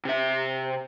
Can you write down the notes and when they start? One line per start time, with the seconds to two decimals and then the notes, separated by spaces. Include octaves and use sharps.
0.05 C3 E5